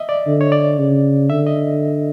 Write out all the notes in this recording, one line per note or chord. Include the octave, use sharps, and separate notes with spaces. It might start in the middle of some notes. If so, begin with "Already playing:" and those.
Already playing: D#5 E5
D5
D3
C#5
D5
C#3
D3 E5
D#5